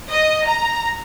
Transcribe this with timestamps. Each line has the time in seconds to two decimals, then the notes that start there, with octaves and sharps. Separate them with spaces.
0.10 D#5
0.46 A#5